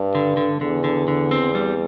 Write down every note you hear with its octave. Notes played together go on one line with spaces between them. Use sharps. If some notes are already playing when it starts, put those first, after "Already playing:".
Already playing: G2
D3
D3
E2 D3
D3
D3
C4
G3